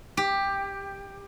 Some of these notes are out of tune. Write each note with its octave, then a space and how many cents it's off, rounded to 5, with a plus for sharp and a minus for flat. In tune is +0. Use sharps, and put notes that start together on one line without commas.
G4 +10